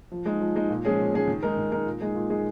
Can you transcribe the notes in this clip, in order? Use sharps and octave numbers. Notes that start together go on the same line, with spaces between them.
F3
G#3 D#4
F3
G#3 D#4
A#2
F3 G#3 C#4 G#4
A#2
F3 G#3 C#4 G#4
D#3
G#3 D#4 A#4
D#3
G#3 D#4 A#4
A#2
G#3 D#4 G#4
A#2
G#3 D#4 G#4